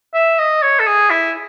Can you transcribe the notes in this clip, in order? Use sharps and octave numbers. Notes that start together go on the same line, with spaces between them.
E5
D#5
C#5
A4
G#4
E4